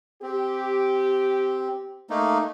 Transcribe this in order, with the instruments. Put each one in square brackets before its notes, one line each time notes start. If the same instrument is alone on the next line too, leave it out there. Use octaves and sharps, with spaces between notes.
[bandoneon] C4 [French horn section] G4
[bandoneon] A3 A#3 D#4